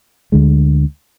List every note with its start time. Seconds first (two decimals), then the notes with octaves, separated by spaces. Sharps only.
0.32 D2 D3 G#3